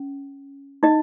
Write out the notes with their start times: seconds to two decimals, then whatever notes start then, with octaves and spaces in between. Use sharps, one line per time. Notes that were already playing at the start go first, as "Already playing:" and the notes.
Already playing: C#4
0.83 D#4 D#5